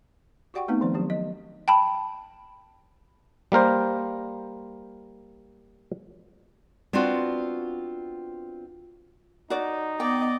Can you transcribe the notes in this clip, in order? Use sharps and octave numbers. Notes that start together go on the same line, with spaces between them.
F#4 G4 D5 F#5 G5 C#6
A3 B3 C4 D#4 B4
D#3 F3 C4 D5
F#3 D4 G4
D#5
G5 A5 B5
G3 A#3 A#4 C5
B3 C4 D4 F4 F#4
D#4 F#4 D5
B3 D5 D#5 G5